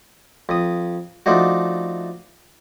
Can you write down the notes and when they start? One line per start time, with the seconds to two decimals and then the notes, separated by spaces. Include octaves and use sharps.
0.49 F2 D#6
1.26 F3 A3 D4 D#4 F#4